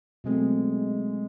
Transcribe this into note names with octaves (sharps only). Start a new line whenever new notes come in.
B2 F#3 G#3 A3 C4